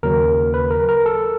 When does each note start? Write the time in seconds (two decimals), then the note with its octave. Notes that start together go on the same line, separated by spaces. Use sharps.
0.03 D#2 C#3 F#3 A#4
0.54 B4
0.71 A#4
0.89 A#4
1.06 A4